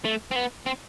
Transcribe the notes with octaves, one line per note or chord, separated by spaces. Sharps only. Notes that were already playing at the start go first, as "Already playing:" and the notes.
A3
C4
B3
C4